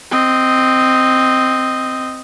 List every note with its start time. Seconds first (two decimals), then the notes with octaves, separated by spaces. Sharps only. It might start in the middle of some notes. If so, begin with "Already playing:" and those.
0.11 C4 D#5